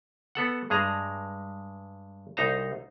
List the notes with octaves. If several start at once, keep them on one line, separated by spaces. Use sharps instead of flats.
B3 A4 F#5
G2 G#3 G#4 A#5
C2 D#4 C5 A#5